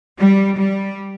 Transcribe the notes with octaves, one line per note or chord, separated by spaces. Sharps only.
G3
G3